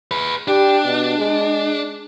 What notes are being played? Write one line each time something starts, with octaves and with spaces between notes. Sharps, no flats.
G#4 B4
D4 G4
B2
G#3